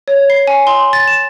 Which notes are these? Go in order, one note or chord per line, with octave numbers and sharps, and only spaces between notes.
C#5
C7
G#5
C6
A6
E7